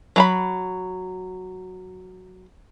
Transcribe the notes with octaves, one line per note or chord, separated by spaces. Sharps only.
F#3 A#5 B5